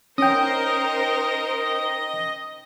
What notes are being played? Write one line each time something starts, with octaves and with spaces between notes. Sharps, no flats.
C#4 D#4 A#4 C5 D#5 G5 D#6